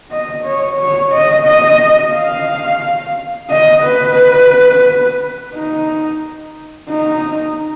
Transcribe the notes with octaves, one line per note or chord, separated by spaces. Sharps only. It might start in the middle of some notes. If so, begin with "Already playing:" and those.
D#5
C#5
C#5
D#5
D#5
F5
D#5
B4
D#4
D#4